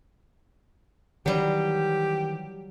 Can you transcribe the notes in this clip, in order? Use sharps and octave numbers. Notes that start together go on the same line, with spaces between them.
D#3 E3 F#3 G3 G4